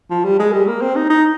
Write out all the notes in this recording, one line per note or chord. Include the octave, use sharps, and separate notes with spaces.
F3
G3
G#3
G3
A#3
C4
D#4
D#4